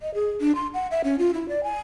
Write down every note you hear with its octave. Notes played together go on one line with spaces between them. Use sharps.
D#5
G#4
D4
C6
F#5
E5
C#4
F4
E4
D5
G#5